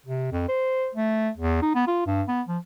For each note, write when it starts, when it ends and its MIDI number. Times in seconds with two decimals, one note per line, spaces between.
0.06 0.31 48
0.32 0.46 41
0.48 0.89 72
0.95 1.30 57
1.37 1.61 40
1.62 1.71 63
1.75 1.83 59
1.87 2.02 65
2.06 2.23 43
2.28 2.42 59
2.48 2.58 53